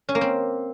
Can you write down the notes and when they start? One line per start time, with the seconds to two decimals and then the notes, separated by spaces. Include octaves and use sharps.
0.09 C#4
0.15 A#3
0.21 C4